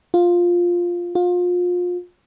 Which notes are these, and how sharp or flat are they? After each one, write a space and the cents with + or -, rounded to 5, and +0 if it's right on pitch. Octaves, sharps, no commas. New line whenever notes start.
F4 +5
F4 +30